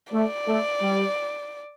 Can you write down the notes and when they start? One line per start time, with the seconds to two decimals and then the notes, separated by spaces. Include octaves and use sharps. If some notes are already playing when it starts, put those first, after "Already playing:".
0.13 A3 D5
0.47 A3
0.82 G3